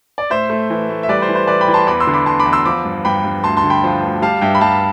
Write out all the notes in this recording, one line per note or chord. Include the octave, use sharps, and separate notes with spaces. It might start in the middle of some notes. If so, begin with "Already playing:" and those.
D5
A2 C5 E5
A3
E3
A3
E5
G3 B4 D5
C5
E3
C5
E3 B4 D5
G5 B5
E3
A5 C6
E2 B5 D6
C6 E6
D3
B5 D6
E2 A5 C6
B5 D6
E2
C6 E6
F3 B5 D6
G2
G2 G5 B5
G2
D2 A5 C6
A5 C6
D3
G5 B5
F3
D2
G3 F5 A5
G2 E5 G5
B5
G2 F5 A5